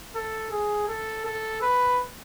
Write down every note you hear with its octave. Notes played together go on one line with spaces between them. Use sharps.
A4
G#4
A4
A4
B4